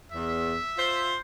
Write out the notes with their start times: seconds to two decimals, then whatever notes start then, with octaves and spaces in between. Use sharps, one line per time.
0.12 E2 E5
0.77 F4 C5